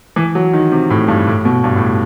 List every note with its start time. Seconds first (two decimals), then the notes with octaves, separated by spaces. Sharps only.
0.16 E3
0.35 F#3
0.53 D#3
0.72 C3
0.90 A2
1.08 G2
1.27 A2
1.45 B2
1.64 G2
1.76 A2